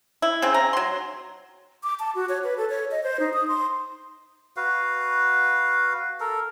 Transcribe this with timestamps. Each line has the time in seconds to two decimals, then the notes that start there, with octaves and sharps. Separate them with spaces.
0.22 E4
0.42 C#3 C4
0.54 A#5
0.73 F#3 C6
1.83 D6
2.00 A5
2.15 F#4
2.29 C#5
2.44 B4
2.57 A4
2.70 C#5
2.91 D#5
3.03 C5
3.20 D#4
3.33 D#6
3.48 C6
4.57 F#4 B4 F5
6.20 A4 A#4